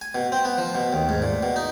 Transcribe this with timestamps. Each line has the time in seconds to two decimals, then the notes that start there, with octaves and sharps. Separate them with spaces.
0.01 G#5
0.15 B2
0.32 C4
0.45 B3
0.58 F3
0.75 B2
0.93 D#2
1.09 G#2
1.22 A#2
1.43 B2
1.56 D#4